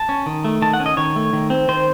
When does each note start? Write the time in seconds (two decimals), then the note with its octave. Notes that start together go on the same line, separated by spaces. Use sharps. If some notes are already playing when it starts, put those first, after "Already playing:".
Already playing: A5
0.09 C#4
0.26 D#3
0.45 A3
0.62 D#3 A5
0.73 F#5
0.80 C#4
0.86 D#5
0.97 D#3 C#5
1.16 A3
1.33 D#3
1.50 C4
1.68 D#3 C5